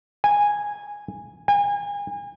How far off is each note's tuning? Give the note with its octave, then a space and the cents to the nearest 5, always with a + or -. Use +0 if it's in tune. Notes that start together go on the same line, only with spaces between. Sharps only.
G#5 -10
G#5 -35